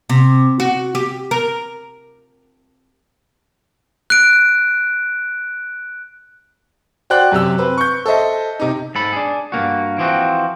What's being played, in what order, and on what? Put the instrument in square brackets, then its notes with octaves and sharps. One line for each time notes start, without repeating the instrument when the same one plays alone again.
[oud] C3
F#4
G4
A#4
[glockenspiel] F#6 D7
[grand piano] F#4 C5 D5 G5 F#6
F#2 C3 G4 E6
C4 B4
C#6 G6
A4 C5 D#5 E5
C3 D#4
[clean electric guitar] G#2 A4 B5
D4 G#4
G2 C#3 A#3 F#4
E3 F3 C4 F#4